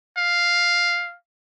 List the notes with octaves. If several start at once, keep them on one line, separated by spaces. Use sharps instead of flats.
F5